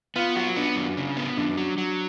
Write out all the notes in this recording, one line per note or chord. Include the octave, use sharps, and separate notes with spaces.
B3 F4
F#3 F#4
B3 D4
F#2
C#3
B3
F#2 D4
F#3
F#3